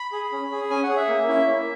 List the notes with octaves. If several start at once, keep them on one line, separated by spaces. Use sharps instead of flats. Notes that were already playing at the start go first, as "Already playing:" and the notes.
Already playing: B5
G#4
C#4
G#4
C#4 G#5
F#5
G#4
E5
A#3
C#4 E4
A#3